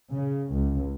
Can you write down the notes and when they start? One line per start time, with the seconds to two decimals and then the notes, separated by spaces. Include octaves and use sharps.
0.13 C#3
0.55 C#2